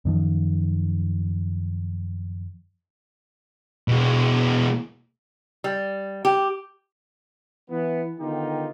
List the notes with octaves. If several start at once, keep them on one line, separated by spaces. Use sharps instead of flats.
F#2 D#3 F3
B2 G#3
G3
G4
E3 B3
D3 D#3 B3 D#4 F4 G4